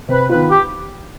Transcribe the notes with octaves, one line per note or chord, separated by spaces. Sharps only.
C3 B4
D#3 B3 F4 B4
G4